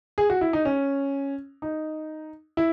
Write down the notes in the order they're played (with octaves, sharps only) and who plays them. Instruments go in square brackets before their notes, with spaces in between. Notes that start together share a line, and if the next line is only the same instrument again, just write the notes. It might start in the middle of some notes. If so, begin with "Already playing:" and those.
[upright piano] G#4
F#4
E4
D#4
C#4
D#4
E4